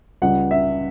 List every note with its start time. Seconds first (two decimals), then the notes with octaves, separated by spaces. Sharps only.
0.22 C#2 C#3 G3 F#5
0.51 E5